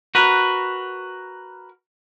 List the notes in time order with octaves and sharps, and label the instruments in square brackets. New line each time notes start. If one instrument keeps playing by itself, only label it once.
[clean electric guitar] F#4 A#4 B4